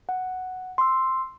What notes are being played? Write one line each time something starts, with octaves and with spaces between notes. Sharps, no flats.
F#5
C6 E6